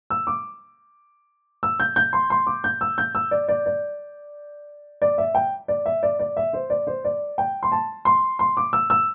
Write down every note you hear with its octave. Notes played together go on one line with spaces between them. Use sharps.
E6
D6
E6
G6
G6
C6
C6
D6
G6
E6
G6
E6
D5
D5
D5
D5
E5
G5
D5
E5
D5
D5
E5
C5
D5
C5
D5
G5
C6
A5
C6
C6
D6
E6
E6